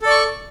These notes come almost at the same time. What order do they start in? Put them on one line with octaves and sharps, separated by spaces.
A4 D5 C#6